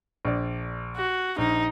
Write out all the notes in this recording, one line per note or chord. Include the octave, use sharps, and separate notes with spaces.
A#1 D5
F#4
A#1 D#4